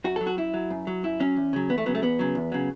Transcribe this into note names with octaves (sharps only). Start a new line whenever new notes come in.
F#2 F#4
F#3 A4
F#4
F#2 E4
F#3
F#2
F#3
F#2 E4
F#3 C#4
E2
C#3 F#3
E2 B3
A3
C#3 F#3 B3
A3
E2 B3
C#3 F#3
E2
C#3 F#3